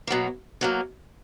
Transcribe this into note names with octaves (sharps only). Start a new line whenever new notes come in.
B2 F#3 A#3
B2 F#3 A#3